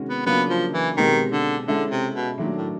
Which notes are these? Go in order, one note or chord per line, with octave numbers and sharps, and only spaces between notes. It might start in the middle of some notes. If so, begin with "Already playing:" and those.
Already playing: C3 D#3 G#3 C#4 F#4
B3
C#3 F#3 A#3 B3 D4 F4
F3
E3
B2 D#3 G#3 C4 D#4 G4
D3
D3 G#3 C#4 E4 A4
C3
B2
A#2 D#3 F#3 A3 D4
A2